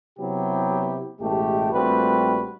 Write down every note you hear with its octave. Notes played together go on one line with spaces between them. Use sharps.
C3 F#3 B3 E4 G4
A1 B2 G#3 A3 G4
A#1 G3 A3 C4 F#4 B4